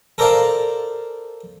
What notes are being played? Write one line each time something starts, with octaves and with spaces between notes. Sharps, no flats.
A4 A#4 C5 D5 F5 A5